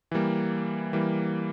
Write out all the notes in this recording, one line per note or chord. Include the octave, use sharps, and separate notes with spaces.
E3 G3 A#3
E3 G3 A#3